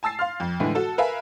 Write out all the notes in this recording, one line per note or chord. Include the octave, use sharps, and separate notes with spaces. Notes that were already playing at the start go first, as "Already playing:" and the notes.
G#5 A5 E6 A6 C7
F5 C6 F6
F2
A2 D3 E3 G#3
F#4 A4 A5
A#4 B4 E5 F5 G#5